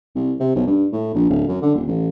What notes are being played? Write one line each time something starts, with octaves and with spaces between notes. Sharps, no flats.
C2
C3
B1
G2
A2
A#1
D1
F#2
D3
D#1
A1